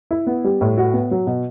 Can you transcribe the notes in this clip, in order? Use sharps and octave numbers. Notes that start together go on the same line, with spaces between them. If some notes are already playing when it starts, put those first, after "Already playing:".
E4
B3
G3
A2
F#4
B3
F#3
B2